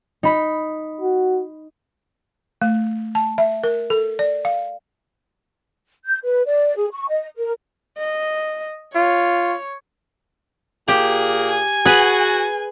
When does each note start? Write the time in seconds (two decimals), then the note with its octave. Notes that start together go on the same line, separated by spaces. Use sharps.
0.23 D#4 B5
1.01 F#4
2.62 A3
3.15 A5
3.38 E5
3.64 A#4
3.90 A4
4.19 D5
4.45 F5
6.06 G6
6.24 B4
6.46 D5
6.76 G#4
6.92 C#6
7.08 D#5
7.37 A#4
7.98 D#5
8.95 F4 C#5
10.88 A#2 A#3 G4 G#4
11.49 G#5
11.85 F#4 G#4 B4